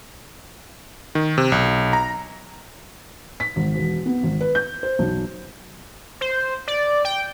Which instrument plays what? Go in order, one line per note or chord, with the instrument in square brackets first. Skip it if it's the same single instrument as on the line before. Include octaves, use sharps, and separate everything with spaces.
[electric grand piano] D#3
C3
B1
A#5
[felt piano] B6
G#1
E1
B3
G#1
B4
G6
C5
B1
[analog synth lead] C5
D5
G5